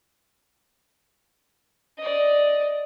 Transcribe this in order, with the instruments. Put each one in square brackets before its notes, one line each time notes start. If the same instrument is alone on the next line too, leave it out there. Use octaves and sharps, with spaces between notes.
[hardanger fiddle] D5 D#5